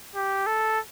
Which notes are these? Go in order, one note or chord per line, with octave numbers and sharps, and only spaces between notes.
G4
A4